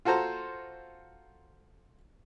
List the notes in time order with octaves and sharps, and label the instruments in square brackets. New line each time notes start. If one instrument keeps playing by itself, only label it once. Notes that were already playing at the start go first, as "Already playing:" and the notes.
[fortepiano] F4 F#4 A4 C5 A#5